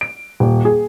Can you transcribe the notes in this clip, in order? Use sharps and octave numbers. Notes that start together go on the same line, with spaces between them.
D7
D#1
G#4